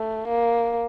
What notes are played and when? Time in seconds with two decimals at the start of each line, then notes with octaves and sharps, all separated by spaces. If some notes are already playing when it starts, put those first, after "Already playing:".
Already playing: A3
0.28 A#3